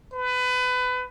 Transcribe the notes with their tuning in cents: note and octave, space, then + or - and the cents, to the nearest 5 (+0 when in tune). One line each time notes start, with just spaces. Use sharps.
B4 +25